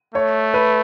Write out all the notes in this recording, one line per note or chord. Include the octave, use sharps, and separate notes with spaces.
A3 C#5
B4